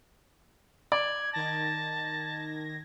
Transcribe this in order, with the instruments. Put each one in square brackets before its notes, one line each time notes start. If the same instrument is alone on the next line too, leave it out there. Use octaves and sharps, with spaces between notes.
[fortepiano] D5 [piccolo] G#6
[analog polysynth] D#3 G#6 A#6 [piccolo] A5